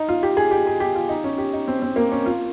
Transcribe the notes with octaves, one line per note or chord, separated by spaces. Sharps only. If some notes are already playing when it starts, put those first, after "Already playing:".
Already playing: D#4
F4
G4
G#4
G4
G#4
G4
F4
D#4
C#4
G4
D#4
C4
C4
A#3
C#4
F4